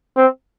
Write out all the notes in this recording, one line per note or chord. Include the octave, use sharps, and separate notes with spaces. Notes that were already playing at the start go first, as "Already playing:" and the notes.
C4